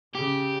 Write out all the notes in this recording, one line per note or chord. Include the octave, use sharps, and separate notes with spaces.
C#3 G4